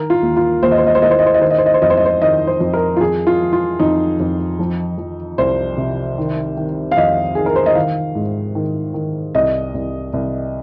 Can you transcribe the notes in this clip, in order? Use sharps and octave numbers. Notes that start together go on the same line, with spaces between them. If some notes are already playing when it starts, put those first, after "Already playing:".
Already playing: D#3 A#4
F4
D#2
F4
D#2 C5
D#5
C5
D#5
C5
D#2 D#5
C5
D#5
C5
D#5
D#3 C5
D#5
C5
D#5
C5
F2 D#5
C5
D#5
C5
D#3 D#5
C5
F2
A#4
F4
F2 G#4
F4
F3
F4
F2 D#4
F2
F3
F3
C2 C5
C3
D#3
D#3
F5
F2 D#5
D#3 G#4
A#4
C5
D#5
D#3 F5
G#2
D#3
D#3
C2 D#5
C2
C2